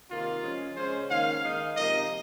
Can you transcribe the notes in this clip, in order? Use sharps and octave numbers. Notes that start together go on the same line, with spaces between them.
C3 D#3 A#3 D#4 F4
C#3 F3 G#3 C#4
C#3 G#3 C#4 C5
D#3 A#3 C#4 F5
D#3 G#3 D#4
C3 F3 A#3 D#4 D#5